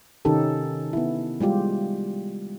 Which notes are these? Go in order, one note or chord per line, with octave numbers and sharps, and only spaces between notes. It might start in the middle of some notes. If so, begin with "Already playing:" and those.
C3 D#3 C#4 D#4 G4 A4
B3 E4
G3 G#3 F4 G4